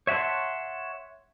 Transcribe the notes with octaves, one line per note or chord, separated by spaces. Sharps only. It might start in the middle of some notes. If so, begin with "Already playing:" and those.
C#5 E5 F#5 A5 C6